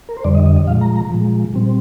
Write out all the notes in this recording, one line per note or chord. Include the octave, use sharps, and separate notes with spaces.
A#4
C5
F2 D3 G3 D5
D#5
D#5
D#5
A#2 F3 G#3 F5
A#5
A#5
A#2 F3 G#3
A#2 G3 C4